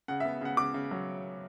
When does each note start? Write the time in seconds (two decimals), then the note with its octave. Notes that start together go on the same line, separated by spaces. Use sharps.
0.08 C#3 F#5
0.20 E5
0.25 B3
0.41 C#3 F#5
0.57 C#3 D6
0.74 C#3
0.91 F#3